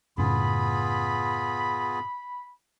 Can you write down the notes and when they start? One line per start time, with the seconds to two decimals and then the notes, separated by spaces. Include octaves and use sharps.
0.18 F#2 A2 C#3 B3 F4 G#4 B5